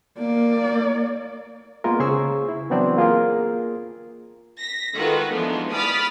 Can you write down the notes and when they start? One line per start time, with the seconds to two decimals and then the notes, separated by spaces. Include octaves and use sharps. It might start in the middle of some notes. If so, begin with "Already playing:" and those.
0.18 A#3 D5
1.84 G#3 A#3 B3 F4 A#4
2.00 C#3 G#4 C5 G#5 C#6 E6
2.49 E4
2.70 E3 F#3 B3 C4 D4 D5
2.97 A#3 F4 G#4 A#4
4.58 A#6 B6
4.94 D#3 G#3 F4 F#4 A4 B4
5.31 E3 F3 G#3 B3 D4 D#4
5.72 D5 B5 D#6 F6 A6 B6